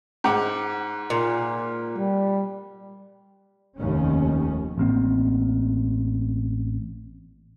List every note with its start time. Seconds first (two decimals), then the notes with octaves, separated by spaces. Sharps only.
0.24 G#2 F#5 D6
1.10 A#2
1.97 G3
3.78 F1 D#2 C#4
4.78 A1 A#3 C4